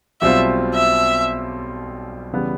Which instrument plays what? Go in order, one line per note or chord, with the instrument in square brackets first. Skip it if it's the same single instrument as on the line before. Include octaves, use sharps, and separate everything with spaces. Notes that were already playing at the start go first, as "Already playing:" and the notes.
[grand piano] B1 B2 G3 C4 F4 [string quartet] E5
[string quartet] E5
[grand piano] C#3 E3 G3 B3